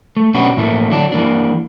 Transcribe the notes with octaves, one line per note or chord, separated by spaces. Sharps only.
A3
B2 C#4 D4 F#4 G4 B4
A2 E3 A3 A#3
D3 F#3 D4
E3 A#3 D4